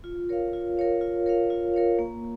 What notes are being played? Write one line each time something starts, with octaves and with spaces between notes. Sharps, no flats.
F4
A#4 C#5 F5
F4
A#4 C#5 F5
F4
A#4 C#5 F5
F4
A#4 C#5 F5
A#3